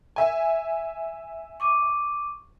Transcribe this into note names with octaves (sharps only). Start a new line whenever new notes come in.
E5 G#5
C#6 D6 D#7